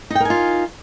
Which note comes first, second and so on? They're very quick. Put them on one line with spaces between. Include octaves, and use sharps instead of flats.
D#4 G5 A#4 G#5 F4